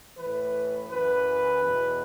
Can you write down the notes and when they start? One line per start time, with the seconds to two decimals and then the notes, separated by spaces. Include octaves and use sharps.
0.16 A2 E3 B4
0.89 F#2 E3 B4
1.63 E2 B2